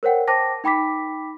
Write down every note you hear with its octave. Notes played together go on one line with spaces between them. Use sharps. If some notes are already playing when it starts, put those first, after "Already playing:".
A#4 C5 C#5 F#5 G5
C5 G5 A5 D6 A#6
D#4 G5 B5 D6 B6